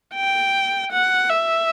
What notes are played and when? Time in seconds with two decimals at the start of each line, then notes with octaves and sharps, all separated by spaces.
0.15 G5
0.92 F#5
1.30 E5